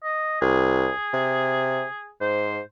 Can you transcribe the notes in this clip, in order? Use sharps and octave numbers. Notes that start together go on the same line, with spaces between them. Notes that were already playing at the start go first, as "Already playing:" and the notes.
D#5
C2 G#4
C3
G#2 C5